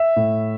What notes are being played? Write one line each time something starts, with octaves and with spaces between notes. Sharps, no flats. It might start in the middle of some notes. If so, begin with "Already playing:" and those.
Already playing: E5
A2